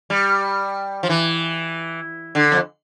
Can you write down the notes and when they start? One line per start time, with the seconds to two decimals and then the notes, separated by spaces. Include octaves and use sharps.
0.10 G3
1.03 F3
1.09 E3
2.35 D3
2.52 F2